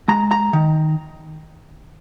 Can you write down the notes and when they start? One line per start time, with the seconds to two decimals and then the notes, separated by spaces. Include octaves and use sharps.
0.08 G#3 A#5
0.31 A#5
0.53 D#3